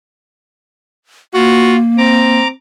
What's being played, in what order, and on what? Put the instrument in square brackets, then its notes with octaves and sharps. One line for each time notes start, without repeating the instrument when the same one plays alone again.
[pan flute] A#3 [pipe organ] F4 [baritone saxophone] F#4
[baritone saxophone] C4 [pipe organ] A#5 D6